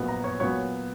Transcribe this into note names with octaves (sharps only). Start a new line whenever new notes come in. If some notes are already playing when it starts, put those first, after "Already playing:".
Already playing: A#1 A#2 F#3 B3
A#5
C#5
A#2 F#3 B3 C#5